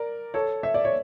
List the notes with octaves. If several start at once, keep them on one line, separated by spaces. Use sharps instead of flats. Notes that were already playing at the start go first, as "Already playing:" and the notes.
Already playing: A#4 D5
A4 C#5
E5
D5
C#5